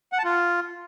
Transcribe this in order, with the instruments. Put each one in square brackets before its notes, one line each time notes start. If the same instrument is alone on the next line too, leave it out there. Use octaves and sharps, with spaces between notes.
[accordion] F#5
A5
F4